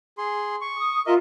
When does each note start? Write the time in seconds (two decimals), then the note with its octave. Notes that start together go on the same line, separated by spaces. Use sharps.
0.18 G#4 C6
0.61 C#6
0.77 D#6
1.07 F4 A#4 D#5 E5